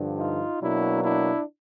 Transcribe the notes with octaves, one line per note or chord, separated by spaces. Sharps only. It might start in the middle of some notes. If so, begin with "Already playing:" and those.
Already playing: G2 D3 F3
D#4 F4
B2 F#3 A#3 D4 E4
D4 E4